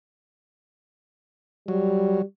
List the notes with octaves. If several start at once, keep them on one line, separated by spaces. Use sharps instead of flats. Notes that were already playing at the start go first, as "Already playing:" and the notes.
F#3 G3